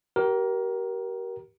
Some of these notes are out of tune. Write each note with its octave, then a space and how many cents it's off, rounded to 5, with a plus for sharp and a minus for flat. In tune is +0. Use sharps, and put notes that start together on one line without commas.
G4 -35 A#4 +20